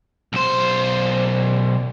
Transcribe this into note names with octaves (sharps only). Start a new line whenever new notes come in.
B1 C5